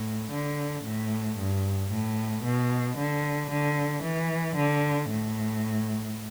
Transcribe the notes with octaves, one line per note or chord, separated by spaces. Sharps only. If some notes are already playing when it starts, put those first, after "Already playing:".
Already playing: A2
D3
A2
G2
A2
B2
D3
D3
E3
D3
A2